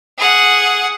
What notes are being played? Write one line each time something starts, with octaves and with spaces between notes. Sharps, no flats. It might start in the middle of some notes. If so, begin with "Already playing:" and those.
G#4 F#5